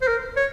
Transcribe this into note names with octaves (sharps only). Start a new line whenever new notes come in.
C5
A#4
C#5